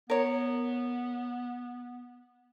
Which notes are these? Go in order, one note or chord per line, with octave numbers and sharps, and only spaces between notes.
B3 A#4 C#5